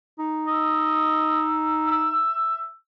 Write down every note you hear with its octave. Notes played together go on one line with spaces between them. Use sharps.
D#4
D#5 E6
E5